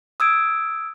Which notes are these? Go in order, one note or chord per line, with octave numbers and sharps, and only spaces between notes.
D#6 E6 G#6 D7